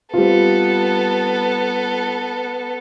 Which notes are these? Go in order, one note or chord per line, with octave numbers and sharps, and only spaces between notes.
G3 B3 C4 F4 A4